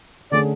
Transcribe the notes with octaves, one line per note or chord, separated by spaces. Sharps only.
D3 A3 C#4 G#4 D5